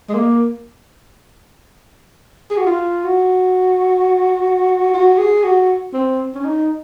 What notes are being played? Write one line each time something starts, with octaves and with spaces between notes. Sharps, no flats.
G#3
A#3
G#4
F#4
F4
F#4
F#4
G#4
F#4
C4
C#4
D#4